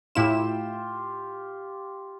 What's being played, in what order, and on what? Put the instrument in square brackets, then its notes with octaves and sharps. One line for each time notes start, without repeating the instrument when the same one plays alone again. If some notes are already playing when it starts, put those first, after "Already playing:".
[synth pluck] A2 E4 E7 [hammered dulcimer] F4 G4